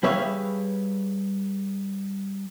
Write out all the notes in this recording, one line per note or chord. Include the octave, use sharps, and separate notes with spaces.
G3 G#4 B4 C#5 E5 F5